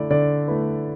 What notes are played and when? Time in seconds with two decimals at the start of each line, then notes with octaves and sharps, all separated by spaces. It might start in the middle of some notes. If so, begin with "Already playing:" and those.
Already playing: D3 A3 E4 D5
0.10 D3 D5
0.48 A3 E4 B4